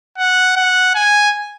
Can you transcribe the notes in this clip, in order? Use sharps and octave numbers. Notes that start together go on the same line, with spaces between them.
F#5
F#5
G#5